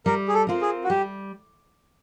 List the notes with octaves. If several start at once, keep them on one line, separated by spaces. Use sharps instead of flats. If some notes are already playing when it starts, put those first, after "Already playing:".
G3 A#4
G#4
A4
C4 F4 A#4
G#4
F#4
G3 G4